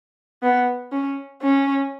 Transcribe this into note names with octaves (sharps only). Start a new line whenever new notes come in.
B3
C#4
C#4